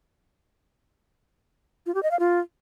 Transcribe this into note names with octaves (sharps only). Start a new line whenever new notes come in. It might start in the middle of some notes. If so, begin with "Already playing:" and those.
F4
G4
D#5
F5
F4